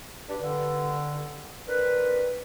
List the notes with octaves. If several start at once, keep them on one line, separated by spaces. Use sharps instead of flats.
G2 D4 G4
G2 D3
C4 D4 A#4 B4